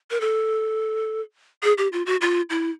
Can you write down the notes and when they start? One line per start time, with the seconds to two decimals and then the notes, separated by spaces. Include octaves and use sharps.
0.11 A#4
0.21 A4
1.63 G#4
1.78 G4
1.93 F4
2.06 F#4
2.21 F4
2.50 E4